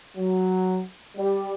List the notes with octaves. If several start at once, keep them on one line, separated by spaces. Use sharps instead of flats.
F#3
G3